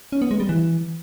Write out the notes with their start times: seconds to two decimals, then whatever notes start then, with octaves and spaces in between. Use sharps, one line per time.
0.12 C#4
0.22 B3
0.31 G#3
0.40 G3
0.49 E3